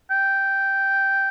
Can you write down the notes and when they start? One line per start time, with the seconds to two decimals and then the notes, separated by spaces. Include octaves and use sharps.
0.11 G5